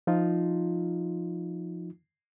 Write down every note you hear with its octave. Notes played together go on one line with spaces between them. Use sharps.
F3 D#4 F4